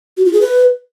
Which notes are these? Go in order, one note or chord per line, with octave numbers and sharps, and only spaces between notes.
F#4
F4
G#4
B4